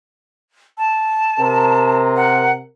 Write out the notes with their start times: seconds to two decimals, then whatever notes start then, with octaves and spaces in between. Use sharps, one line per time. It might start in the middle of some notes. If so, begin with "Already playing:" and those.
0.78 A5
1.39 C3 A#4
2.16 F#5